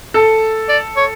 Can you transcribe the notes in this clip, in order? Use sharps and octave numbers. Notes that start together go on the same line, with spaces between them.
A4
D5
C#5